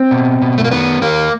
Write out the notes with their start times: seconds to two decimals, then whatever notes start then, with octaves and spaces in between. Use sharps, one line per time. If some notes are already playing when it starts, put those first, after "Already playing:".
Already playing: C4
0.11 B2
0.42 B2
0.58 A3
0.64 A#3
0.71 D#3 B3
1.02 D#3 A#3